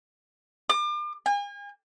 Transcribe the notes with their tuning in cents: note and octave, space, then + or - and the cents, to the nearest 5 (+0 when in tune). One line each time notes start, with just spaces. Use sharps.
D6 +40
G#5 -40